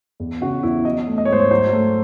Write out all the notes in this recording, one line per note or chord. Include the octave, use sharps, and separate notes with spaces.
E2
C#3 F#4
E2 E4
F#3 D#5
A3
D#5
C#5
G#2 C5
C#5
F#3 C5
A3